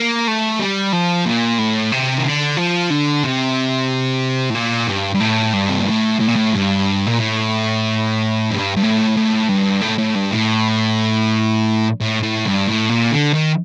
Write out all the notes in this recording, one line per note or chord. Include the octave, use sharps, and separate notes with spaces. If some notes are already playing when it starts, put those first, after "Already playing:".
Already playing: A#3
A3
G3
F3
A#2
A2
C3
D#3
D3
F3
D3
C3
A2
A#2
G2
G2
A2
G2
C3
A#2
A2
A2
A#2
A2
G2
A#2
A2
G2
G2
A2
A2
G2
A2
A2
G2
A2
A2
A2
G2
A2
A#2
D3
D#3